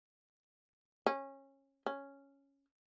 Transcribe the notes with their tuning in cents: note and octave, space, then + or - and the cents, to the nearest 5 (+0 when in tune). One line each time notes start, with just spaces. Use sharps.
C#4 -20
C#4 +0